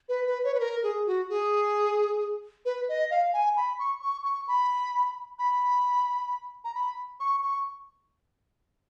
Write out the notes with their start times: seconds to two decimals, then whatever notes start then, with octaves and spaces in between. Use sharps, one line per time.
0.09 B4
0.27 B4
0.44 C#5
0.54 B4
0.60 A#4
0.83 G#4
1.06 F#4
1.29 G#4
2.65 B4
2.89 D#5
3.11 F5
3.33 G#5
3.57 B5
3.79 C#6
4.01 C#6
4.25 C#6
4.48 B5
5.39 B5
6.64 A#5
6.75 B5
7.20 C#6
7.43 C#6